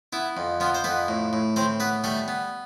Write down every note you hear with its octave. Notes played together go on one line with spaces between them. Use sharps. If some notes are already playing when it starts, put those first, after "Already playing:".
B3 E4
F2
F3 B3 F4
C5
F2 B3 B4
A2
A2
A2 C4 C5
B3 B4
G3 A3 A4
B3